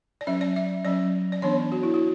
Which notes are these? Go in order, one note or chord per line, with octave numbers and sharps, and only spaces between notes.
D5
F#3 C#4 E5
D5
E5
F#3 C#4 D5
D5
E3 B3 D4 C#5
F#4
E4
F#4